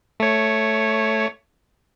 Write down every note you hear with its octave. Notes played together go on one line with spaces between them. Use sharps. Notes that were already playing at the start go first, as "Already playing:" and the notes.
A3 C#5